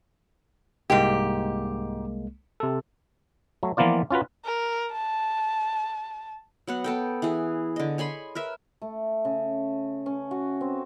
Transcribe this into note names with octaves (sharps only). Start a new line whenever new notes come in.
C2 G#2 G#3 A#3 G4
C3 A4
F#3 A3
E3 F3 A#3 B3 F4 D5
C#4 F4 F#4 B4
A#4
A5
F#3 B3 F#5
B3 A4 G5
E3 G#4
D3 D#5
C#5 G#5 B5 C6
A#4 B4 E5
A3
C#3
C#4
F#4
C4